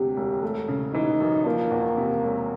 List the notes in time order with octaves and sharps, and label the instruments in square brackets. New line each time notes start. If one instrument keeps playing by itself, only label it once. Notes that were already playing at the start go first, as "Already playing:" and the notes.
Already playing: [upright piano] E1 D2 C3 [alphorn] G4
[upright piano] E1
A3
C#3
[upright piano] E3 [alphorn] D#4
[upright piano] F#2
[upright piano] F3 [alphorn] A#3
[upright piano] E2
C3
E1